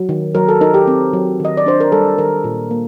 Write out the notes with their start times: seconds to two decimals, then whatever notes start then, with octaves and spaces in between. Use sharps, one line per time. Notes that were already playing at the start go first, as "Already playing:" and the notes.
Already playing: F#3
0.09 D#3
0.35 F#3 A#4
0.49 A4
0.61 D#4 A#4
0.74 G4
0.87 C4
1.13 F#3
1.40 D#3 D#5
1.57 D5
1.66 D4 C5
1.80 A#4
1.92 G3 A4
2.18 D#3 A#4
2.44 A#2
2.71 A#3